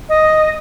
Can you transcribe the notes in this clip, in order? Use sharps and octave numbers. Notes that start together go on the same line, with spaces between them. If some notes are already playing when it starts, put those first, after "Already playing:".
D#5